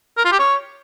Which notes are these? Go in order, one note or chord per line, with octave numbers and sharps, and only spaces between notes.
A#4
F4
G4
C#5